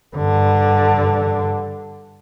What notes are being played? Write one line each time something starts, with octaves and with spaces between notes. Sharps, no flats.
G2 D3